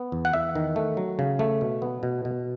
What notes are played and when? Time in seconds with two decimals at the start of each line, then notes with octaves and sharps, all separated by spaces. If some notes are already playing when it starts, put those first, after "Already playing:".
Already playing: B3
0.12 E2
0.25 F#5
0.33 E2 E5
0.55 D#3
0.76 A3
0.97 F#3
1.19 C#3
1.39 A3
1.61 B2
1.82 B3
2.03 B2
2.25 B2